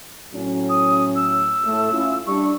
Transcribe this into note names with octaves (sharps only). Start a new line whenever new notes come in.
A2 F#3 C#4
D#6
E6
A2 A3
C#4 E4 F4
G3 D4 C#6